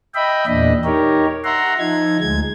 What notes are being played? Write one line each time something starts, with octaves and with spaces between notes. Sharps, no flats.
D#5 E5 G5 B5
E2 A#2 D4 D#5
D#4 G4 A#4 C#5
E5 F#5 A#5 C6
F3 D#4 G#6
D2 G#3 G#6